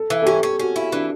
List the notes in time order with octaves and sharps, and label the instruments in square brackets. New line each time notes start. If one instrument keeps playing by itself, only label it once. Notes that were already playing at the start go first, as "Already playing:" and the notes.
Already playing: [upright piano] A4
[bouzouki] E3
[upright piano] A4
[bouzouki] C#4 [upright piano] G4
[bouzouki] C#4
[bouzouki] C#4 [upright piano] F#4
[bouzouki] E4
[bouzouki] E3 [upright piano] D4